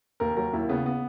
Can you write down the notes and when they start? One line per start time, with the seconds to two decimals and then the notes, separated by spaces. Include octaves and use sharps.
0.20 D#2 A#4
0.36 F#3 A#4
0.53 D#2 E4
0.69 C#3 B3
0.86 B3